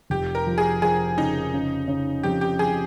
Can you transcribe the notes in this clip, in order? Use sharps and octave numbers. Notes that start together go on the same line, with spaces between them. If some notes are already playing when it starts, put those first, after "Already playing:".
F1 G4
A#4
F3
G#4
F3 G#4
C#3 D#4
C#3
C#3
F2 G4
G4
F3 G#4